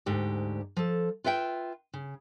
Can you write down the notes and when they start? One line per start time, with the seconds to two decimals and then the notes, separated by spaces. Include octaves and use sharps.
0.06 D2 G#2 G4
0.77 F3 A4
1.24 F4 B4 E5 F#5 G5
1.94 C#3